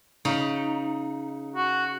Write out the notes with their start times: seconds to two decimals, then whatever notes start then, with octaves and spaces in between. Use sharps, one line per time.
0.25 C#3 D#4
1.56 F#4